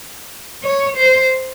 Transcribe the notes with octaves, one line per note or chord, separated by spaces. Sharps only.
C#5
C5